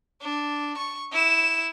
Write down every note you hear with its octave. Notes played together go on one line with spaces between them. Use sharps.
D4
C#6
E4 E7